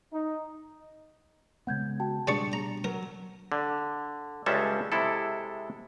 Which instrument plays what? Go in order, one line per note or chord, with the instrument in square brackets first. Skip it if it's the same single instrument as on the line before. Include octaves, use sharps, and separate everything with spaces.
[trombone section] D#4
[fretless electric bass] C#3 G#3 B3 [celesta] F#5 G6 G#6
[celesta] F#4 G5 A5
[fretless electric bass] B2 G3 D4 [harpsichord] G#3 D5 C#6
[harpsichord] A#5
[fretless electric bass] F#3 [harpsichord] A#4
[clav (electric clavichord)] D3
C#2 G3 G#3 C#4 A4 E5
C3 G#3 E4 A4